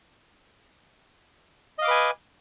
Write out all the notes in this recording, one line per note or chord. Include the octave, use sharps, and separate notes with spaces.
B4 D#5 F5 G#5 D6